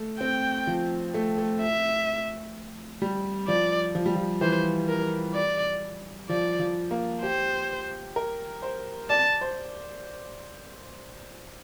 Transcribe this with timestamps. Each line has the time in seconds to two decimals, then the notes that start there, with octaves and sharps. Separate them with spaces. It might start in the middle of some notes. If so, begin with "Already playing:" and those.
Already playing: A3
0.20 C4 G5
0.67 F3
1.14 A3
1.38 A3
1.61 E5
3.02 G3
3.48 F3 D5
3.95 F3
4.06 G3
4.16 F3
4.41 E3 C5
4.89 A#4
5.35 D5
6.29 F3 D5
6.60 F3
6.91 A#3
7.22 G4 C5
8.16 A#4
8.62 C5
9.09 D5 A5
9.41 C5